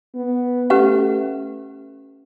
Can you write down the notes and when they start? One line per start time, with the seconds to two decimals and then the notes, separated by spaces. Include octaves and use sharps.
0.15 B3
0.70 A3 C#4 G4 B4 F#5